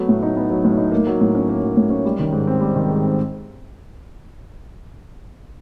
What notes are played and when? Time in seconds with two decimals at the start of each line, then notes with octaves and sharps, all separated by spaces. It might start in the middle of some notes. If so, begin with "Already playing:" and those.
Already playing: F#3 A3 B3
0.09 A2
0.23 D#4
0.37 B3
0.50 F#3
0.65 A2
0.78 D#4
0.92 A#3
1.07 F#3
1.21 A2
1.35 C#4
1.49 A#3
1.62 F#3
1.77 A2
1.90 C#4
2.05 G3
2.19 D#3
2.32 G#2
2.47 C4
2.61 G3
2.75 D#3
2.88 G#2
3.03 C4